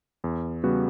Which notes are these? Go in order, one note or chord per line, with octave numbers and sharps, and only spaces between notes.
E2
C#3 G3 B3 F#4